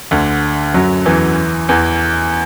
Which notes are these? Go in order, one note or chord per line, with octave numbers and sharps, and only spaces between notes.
D2 D3
F#2 F#3
E2 E3
E2 E3